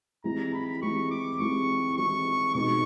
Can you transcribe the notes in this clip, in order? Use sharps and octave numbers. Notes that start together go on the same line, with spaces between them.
E3 G#3 C4 E4 G4 A#5
B5
E3 G#3 C4 E4 G4 C#6
D6
E3 G#3 C4 E4 G4 C#6
E3 G#3 C4 E4 G4 C#6
B2 G#3 B3 D#4 F#4 C#6